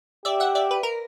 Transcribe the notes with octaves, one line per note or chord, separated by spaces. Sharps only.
G4 D5 E5
E5 F#5
D5 E5
B4
A#4